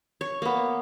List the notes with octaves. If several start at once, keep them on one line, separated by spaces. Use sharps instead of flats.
C#5
A#3 B3